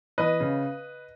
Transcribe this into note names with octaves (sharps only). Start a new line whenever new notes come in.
E3 B4 D#5
C#3